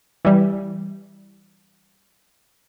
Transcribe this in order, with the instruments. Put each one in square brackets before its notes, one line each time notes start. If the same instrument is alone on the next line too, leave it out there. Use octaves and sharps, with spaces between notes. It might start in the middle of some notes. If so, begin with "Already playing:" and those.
[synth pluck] E3 G3